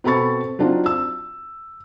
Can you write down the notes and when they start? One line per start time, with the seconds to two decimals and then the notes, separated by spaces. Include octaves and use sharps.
0.04 B2 C4 A4 B5 C#6 A6
0.59 F#3 C4 D4 D#4 F4
0.86 E6